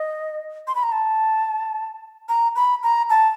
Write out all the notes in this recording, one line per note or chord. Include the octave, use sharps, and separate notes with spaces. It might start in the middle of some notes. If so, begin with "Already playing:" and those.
Already playing: D#5
C6
B5
A#5
A5
A#5
B5
A#5
A5